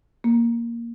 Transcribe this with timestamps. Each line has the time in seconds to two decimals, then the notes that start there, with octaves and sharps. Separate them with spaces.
0.24 A#3